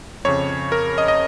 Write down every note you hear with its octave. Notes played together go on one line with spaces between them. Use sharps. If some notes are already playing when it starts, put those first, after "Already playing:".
F2 C#3 C#5
A#4
D#5
D#5